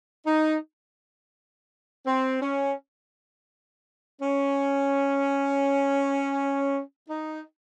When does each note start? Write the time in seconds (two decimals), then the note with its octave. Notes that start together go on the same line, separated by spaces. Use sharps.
0.27 D#4
2.07 C4
2.42 C#4
4.22 C#4
7.10 D#4